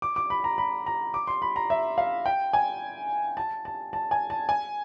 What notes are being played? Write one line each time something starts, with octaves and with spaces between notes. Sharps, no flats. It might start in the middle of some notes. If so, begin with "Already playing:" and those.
D6
D6
B5
A#5
B5
A#5
D6
C6
B5
A#5
E5
F5
G5
G#5
A5
A5
A5
G#5
A5
G#5